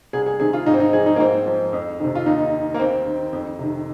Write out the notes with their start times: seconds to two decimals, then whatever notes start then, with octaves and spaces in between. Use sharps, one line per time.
0.13 C2 G#4
0.26 G#4
0.40 C3 D#3 G#4
0.53 F4
0.66 G#2 D#4
0.74 C4
0.80 D#4
0.93 F3 G#4
1.06 D#4
1.16 A#3
1.20 G#2 C4
1.46 F3
1.73 F2
2.00 C3 D#3
2.15 F4
2.26 D#2 D#4
2.53 D#3
2.74 A#3
2.80 D#2 C4
3.06 D#3
3.33 F2
3.59 C3 D#3